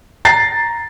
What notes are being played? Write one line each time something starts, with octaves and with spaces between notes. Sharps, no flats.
A#5 A6 C7